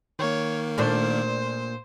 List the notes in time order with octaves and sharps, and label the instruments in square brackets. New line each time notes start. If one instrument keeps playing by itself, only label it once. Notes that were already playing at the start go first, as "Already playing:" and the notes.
[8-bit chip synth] D#3 A#3 [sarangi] C#5
[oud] A#2 A3 D4 [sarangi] C5